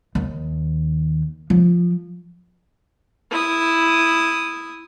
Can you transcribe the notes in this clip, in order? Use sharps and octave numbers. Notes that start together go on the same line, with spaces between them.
D#2
F3
E4 D#6